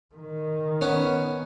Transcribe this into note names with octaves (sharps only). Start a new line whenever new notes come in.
D#3
B3 C#4